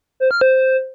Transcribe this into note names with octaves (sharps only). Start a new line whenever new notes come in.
C5
F6
C5